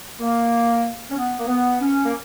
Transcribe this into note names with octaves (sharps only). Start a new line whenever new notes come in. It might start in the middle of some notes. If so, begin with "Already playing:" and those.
A#3
C#4
B3
A#3
B3
C#4
A#3